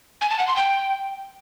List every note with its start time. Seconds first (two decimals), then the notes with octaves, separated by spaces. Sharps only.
0.21 G#5
0.30 A5
0.39 F#5
0.48 C6
0.56 G5